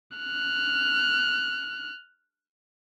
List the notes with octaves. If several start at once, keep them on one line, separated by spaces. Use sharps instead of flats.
F6 F#6